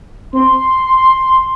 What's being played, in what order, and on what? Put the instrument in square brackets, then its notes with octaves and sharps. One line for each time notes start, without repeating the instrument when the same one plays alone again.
[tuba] C4 [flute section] C6